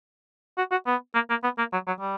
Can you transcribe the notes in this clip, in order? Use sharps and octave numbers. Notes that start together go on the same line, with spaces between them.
F#4
F#4
B3
A#3
A#3
B3
A#3
F#3
F#3
G3